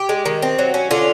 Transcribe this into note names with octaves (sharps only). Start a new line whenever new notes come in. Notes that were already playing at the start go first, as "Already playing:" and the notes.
Already playing: G4
G#3
D#3
C4
F#3
C#4
D3 F4